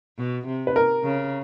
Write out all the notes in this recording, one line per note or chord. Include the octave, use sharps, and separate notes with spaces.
B2
C3
B4
A#4
C#3